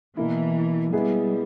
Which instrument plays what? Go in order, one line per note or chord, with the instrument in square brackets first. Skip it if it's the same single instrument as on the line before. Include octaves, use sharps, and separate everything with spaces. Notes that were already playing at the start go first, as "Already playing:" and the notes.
[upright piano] B2 A#3 E4 [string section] E3
[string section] G3 [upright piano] G#3 B3 E4 G#4